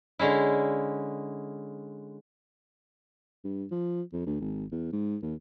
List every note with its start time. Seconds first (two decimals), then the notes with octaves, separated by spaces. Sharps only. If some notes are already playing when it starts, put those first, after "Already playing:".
0.19 D3 G#3 C#4 E4
3.44 G2
3.71 F3
4.13 F2
4.26 D2
4.40 G#1
4.72 E2
4.92 G#2
5.22 D#2